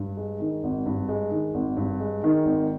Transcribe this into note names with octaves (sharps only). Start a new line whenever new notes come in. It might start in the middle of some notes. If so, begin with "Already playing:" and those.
Already playing: G2
G#3
D#3
G#1
G2
G#3
D#3
G#1
G2
G#3
D#3
G#1